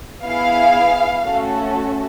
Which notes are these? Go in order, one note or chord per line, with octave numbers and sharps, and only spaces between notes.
B3 E4 G#4 F5
A3 C#4 F#4 A4